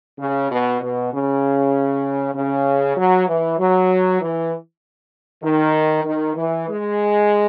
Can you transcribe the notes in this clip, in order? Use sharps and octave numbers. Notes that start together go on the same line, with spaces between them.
C#3
B2
B2
C#3
C#3
F#3
E3
F#3
E3
D#3
D#3
E3
G#3